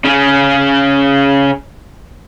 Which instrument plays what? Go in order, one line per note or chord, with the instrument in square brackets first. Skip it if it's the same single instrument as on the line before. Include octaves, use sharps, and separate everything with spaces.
[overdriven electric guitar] C#3 C#4